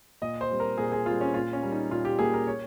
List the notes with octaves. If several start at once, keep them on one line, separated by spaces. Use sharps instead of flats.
A#2 D#5
C5
G3 C4
A#4
A#2 G#4
G#4
G3 C4 F4
C#4
A#2 F4
C#4
G3 A#3
D#4
A#2 F4
G4
G3 A#3 G#4
A#4
C#5